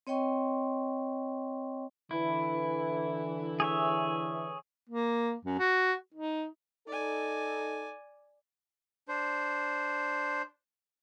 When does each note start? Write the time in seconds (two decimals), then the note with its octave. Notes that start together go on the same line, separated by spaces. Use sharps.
0.07 C4 C#5 D#5 G5 C6 C#6
2.11 D3 E3 E4
3.60 G#4 C#5 E5
4.90 A#3
5.45 F#2
5.59 F#4
6.14 D#4
6.87 D#4 A4 D5 G#5
9.08 D4 C5